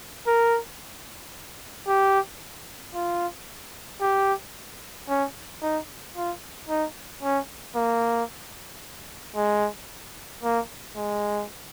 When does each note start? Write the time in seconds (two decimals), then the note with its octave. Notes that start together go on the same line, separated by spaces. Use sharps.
0.27 A#4
1.87 G4
2.95 F4
4.01 G4
5.09 C#4
5.62 D#4
6.16 F4
6.69 D#4
7.23 C#4
7.75 A#3
9.36 G#3
10.43 A#3
10.96 G#3